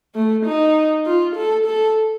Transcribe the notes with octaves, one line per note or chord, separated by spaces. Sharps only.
A3
D#4
F4
A4
A4